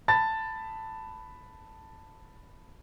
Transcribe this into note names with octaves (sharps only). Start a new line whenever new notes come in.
A5 B5 A6